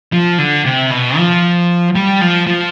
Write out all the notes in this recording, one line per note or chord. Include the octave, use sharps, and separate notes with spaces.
F3
D3
C3
B2
F3
G3
F3
F3